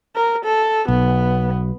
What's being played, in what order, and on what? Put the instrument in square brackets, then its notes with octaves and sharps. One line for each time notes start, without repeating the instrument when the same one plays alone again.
[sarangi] A#4
A4
[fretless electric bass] B1 [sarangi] B3